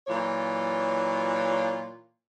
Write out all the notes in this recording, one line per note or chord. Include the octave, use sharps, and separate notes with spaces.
A#2 E3 F#3 F4 C#5 D5